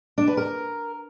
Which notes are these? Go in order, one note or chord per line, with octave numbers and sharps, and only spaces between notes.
D4
B4
A#4